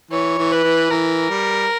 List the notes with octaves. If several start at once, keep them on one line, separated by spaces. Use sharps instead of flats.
E3 C#5
E3
B4
E3
E3 A#4
G3